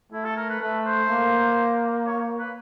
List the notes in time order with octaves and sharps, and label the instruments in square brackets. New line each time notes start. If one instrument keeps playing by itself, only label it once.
[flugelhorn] A3 [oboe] E4
[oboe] A4
A#4
B4
[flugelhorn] A3 [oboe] B4
[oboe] C5
[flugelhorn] A#3
[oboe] C#5
B4